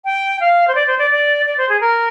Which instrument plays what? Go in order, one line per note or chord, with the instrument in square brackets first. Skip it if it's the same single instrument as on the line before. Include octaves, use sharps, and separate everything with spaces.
[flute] G5
F5
C5
D5
C5
D5
D5
D5
C5
G#4
A#4